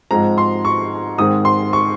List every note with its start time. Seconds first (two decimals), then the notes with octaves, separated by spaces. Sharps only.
0.11 G#2 F3 G#3 C4 A#5
0.38 C6
0.65 C#6
1.18 G#2 D#3 G#3 C4 D#6
1.45 C6
1.73 C#6